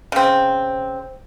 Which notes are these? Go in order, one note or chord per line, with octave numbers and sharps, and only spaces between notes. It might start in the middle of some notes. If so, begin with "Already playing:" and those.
C#3 C4